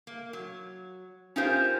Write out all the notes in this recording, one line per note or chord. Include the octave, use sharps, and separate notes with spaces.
A#3
F#3
C#4 D#4 F4 G4 A#4 C5